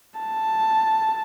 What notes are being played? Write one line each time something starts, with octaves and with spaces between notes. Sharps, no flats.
A5